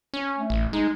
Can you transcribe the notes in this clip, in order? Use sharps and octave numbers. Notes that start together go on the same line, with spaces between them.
C#4
A3
A1
G#3 D#4